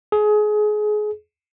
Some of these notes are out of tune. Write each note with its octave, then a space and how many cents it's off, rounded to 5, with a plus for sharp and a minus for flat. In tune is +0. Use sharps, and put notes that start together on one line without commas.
G#4 +25